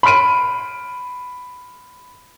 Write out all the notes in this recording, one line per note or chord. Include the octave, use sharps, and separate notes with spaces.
B5 C6 F6 D7 D#7